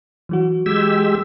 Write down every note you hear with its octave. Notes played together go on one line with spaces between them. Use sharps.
E3 F#3 F#4
G#3 G4 E6